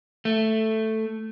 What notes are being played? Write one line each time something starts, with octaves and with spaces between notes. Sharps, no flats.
A3